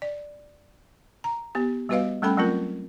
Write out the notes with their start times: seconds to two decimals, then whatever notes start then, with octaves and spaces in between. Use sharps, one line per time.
0.02 D5
1.24 A#5
1.55 B3 G4
1.89 G3 B3 F#4 B4 D#5 F5
2.22 G3 A3 C#4 A4 G5 B5
2.37 F#3 A3 C4 F4 A#4